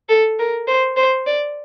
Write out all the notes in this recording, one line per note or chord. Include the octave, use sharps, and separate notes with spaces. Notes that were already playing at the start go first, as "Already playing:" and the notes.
A4
A#4
C5
C5
D5